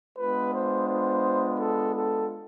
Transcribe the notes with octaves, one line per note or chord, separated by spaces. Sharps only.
G#3 B3 D4 F4 B4
C5
C5
A4
A4